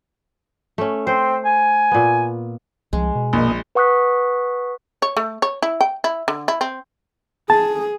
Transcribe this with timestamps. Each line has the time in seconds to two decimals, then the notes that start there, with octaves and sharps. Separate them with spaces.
0.78 A3 C#4
1.07 C4 C5
1.45 G#5
1.91 A#2 B3
2.93 C2 F3 G#3
3.15 B2
3.33 A#1 A#3 D#5
3.75 B4 F#5 C#6 D#6 F#6 B6
5.02 C#5
5.17 A3
5.42 C#5
5.62 E4
5.81 G5
6.04 E4
6.28 D3
6.48 E4
6.61 C4
7.50 G#4 A5